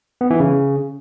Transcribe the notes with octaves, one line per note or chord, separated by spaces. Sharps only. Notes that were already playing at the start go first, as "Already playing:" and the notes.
B3
E3
C#3